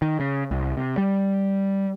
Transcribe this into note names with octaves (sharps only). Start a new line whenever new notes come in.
D#3
C#3
C2
C3
G3